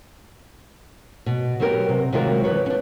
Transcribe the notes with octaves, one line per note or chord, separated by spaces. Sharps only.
B2
F#3 G3 B3 G4 A#4
C3
C3 D#3 F#3 G#3 F4 A#4
E3 B3 B4 C#5
C#4 D4